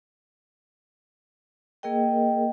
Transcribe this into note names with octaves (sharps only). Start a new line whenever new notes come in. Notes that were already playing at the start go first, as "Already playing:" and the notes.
A#3 G#4 A#4 D#5 G5